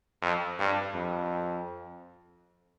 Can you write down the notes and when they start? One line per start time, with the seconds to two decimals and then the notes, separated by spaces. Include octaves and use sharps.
0.22 F2
0.59 G2
0.95 F2